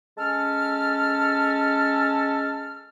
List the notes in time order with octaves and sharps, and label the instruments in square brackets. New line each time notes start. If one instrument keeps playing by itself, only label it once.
[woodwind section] G#3 C#4 A4 A5 F6